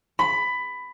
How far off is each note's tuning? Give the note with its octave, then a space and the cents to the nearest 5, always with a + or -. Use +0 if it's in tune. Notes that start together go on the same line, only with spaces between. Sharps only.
B5 +15